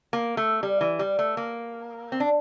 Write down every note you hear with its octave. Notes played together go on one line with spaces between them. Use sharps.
A#3
A3
G3
E3
G3
A3
A#3
C4
D4